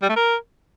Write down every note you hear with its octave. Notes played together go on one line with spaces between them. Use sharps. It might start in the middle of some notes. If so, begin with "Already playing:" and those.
G3
A3
A#4